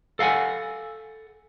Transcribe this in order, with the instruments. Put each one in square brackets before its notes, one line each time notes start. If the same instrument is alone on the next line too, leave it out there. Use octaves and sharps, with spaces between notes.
[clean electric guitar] A4 F5 F#5 G#5